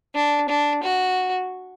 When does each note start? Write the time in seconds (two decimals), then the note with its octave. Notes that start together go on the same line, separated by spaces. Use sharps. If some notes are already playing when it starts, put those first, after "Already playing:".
0.15 D4
0.49 D4
0.84 F#4